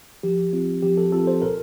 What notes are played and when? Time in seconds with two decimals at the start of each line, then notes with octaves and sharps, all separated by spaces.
0.23 F3 G4
0.53 C4 F4
0.83 F3 G4
0.98 A4
1.12 C4 F4 A4
1.27 C5
1.42 A#2 A#4